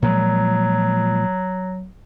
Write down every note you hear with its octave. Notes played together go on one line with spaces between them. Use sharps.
A#2 F3 F#3 G#3